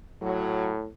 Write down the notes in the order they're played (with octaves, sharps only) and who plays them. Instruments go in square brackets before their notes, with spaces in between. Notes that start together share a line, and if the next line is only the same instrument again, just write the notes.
[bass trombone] A2 [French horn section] F#3